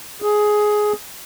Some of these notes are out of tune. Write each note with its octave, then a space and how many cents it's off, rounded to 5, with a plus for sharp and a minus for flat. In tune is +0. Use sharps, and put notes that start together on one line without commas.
G#4 +10